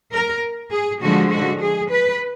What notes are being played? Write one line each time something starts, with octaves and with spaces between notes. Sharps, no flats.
A#4
G#4
D3 F3 G#3 F#4
F#4
G#4
B4